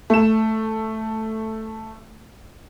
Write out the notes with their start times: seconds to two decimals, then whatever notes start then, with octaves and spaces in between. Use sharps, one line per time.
0.10 A3 E7